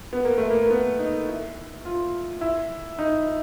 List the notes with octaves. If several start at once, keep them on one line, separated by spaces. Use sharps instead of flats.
B3
A#3
A3
A#3
A#3
B3
D#4
E4
F4
E4
D#4